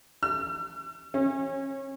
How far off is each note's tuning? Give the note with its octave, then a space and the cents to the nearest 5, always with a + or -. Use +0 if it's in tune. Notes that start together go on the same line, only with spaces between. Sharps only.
E6 +40
C#4 -35